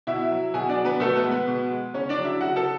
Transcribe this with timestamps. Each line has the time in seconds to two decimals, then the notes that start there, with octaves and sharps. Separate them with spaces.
0.07 B2 E4 E5
0.31 F#3
0.54 B2 G#4 G#5
0.69 D4 D5
0.77 F#3
0.85 B3 B4
1.00 B2 A3 A4
1.16 B3 B4
1.23 G#3
1.31 B3 B4
1.48 B2
1.70 G#3
1.94 C#3 C#4 C#5
2.09 D4 D5
2.18 F#3
2.25 E4 E5
2.40 C#3 F#4 F#5
2.56 A4 A5